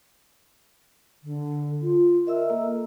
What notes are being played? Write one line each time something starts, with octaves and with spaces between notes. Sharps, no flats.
D3
F4
A#4 D#5 E5 E6
A#3 A4